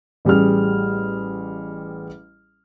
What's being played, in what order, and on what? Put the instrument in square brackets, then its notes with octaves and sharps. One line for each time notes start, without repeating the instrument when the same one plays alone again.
[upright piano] A1 G3 G#4 F6